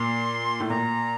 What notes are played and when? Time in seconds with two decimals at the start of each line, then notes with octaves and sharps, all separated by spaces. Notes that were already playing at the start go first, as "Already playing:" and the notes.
Already playing: A#2 C6
0.60 A2
0.70 A#2 A#5